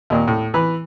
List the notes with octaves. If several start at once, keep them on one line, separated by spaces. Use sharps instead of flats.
D#2 A#2
A2
E3 B4